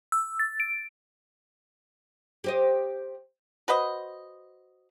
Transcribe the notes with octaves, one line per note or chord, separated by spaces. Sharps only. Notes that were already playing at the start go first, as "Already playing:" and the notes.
E6
A6
D7
G4 C5 D#5
F#4 B4 C5 D#5